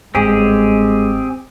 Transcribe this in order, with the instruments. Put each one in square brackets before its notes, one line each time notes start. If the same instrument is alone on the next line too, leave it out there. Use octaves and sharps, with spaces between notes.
[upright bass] G1 G#2 [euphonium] G#3 [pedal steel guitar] C4 G4 G#4